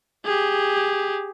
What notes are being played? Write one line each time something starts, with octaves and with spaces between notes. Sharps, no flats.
G4 G#4